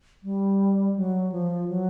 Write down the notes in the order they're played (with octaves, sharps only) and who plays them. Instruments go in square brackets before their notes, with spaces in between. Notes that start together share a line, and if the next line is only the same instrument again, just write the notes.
[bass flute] G3
F#3
F3
F#3